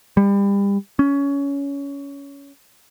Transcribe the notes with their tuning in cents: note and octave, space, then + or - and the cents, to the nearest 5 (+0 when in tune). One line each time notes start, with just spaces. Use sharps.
G3 +30
C#4 +20